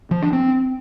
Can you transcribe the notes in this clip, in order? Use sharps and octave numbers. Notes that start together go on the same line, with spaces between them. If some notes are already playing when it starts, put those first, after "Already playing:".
F3
D4
C4